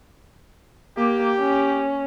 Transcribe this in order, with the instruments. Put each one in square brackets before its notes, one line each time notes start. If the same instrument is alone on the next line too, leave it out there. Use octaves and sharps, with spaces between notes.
[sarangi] A#3 [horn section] G4
[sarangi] C#4